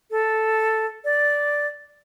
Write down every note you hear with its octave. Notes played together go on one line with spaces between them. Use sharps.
A4
D5